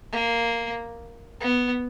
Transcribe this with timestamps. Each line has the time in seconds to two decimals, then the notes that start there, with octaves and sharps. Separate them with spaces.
0.12 A#3
1.41 B3